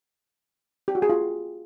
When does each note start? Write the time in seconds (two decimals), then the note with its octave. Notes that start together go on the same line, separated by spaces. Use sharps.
0.88 G4
0.95 F#4
1.02 G#4
1.10 F4